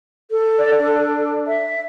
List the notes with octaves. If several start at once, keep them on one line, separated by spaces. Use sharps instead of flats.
A4
D5
D4
E5